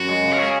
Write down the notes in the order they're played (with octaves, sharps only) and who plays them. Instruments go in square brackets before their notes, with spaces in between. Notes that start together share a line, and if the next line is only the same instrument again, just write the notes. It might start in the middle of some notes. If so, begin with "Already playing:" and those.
Already playing: [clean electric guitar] F#2 [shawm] F#4
[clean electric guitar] G#3
C#3
[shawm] A#4
[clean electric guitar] C#4 [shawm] G#4